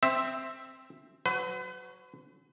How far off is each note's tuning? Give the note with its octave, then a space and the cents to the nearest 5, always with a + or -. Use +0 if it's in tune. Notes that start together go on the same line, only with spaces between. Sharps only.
C4 +0 E5 +0
F#3 +0 B4 +40